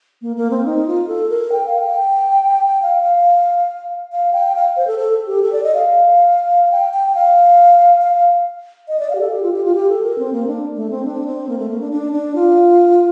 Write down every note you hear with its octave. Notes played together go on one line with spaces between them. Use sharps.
A#3
A#3
C4
D#4
F4
A4
A#4
G5
F5
G5
F5
F5
F5
G5
F5
C5
A4
A4
G4
A4
D5
D#5
F5
G5
G5
F5
F5
D#5
D5
F5
G4
A4
G4
F4
G4
F4
G4
A4
A#4
C4
A#3
D4
A3
C4
D4
C4
A#3
A3
A#3
D4
D4
D4
F4